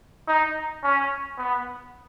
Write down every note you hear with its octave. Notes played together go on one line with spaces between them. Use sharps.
D#4
C#4
B3